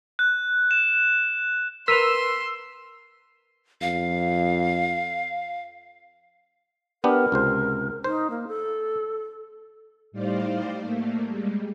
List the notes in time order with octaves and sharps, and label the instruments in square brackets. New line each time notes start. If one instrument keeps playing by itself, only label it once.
[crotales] F#6
E7
[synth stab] A#4 B4 [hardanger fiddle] C6 [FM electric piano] E6 [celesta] B6 D#7 F7
[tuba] F2 [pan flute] F5
[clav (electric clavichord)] B3 D4 G4 [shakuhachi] A#4
[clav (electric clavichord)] C#2 C3 C5
[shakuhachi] D#4 [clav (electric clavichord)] C5
[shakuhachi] A#3
A4
[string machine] A2 G3 D#4 C5 D5 F5
A3 A#3
G3 G#3